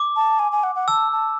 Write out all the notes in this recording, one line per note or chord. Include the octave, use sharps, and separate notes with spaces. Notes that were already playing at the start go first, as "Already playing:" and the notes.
Already playing: D6
A5
G#5
G#5
F#5
F#5
A5 E6
A5